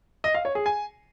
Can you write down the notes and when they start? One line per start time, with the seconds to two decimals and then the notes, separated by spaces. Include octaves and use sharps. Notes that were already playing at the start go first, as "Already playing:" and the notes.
0.24 D#5
0.34 F5
0.45 C#5
0.55 G#4
0.66 G#5